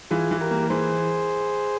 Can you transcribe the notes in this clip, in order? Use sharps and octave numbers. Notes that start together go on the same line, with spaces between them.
E3 F4 G#4
E3
G4 A#4
A#3
E3 G#4 C5